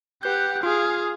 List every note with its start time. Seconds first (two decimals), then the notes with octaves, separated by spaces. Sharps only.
0.23 G4 B4 F#5 G6
0.63 F4 G#4 F5